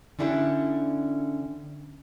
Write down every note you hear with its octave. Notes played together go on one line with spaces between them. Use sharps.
D3 C#4 D4 E4 F#4 G4